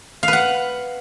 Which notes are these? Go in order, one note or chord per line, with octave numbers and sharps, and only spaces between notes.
F5
B4
F#5